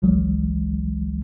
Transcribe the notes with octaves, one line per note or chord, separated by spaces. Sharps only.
G#1 C#2 E3 F#3 G#3